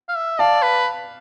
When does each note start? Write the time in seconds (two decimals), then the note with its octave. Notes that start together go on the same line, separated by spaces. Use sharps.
0.09 F5
0.16 E5
0.39 D5 F5 A5
0.63 B4